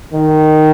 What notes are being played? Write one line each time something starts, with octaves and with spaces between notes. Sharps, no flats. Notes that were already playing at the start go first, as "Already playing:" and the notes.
D#3